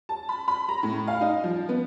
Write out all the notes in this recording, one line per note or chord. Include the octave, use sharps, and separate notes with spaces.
A5
B5
B5
A#5
A2
F5
D#4
F3
B3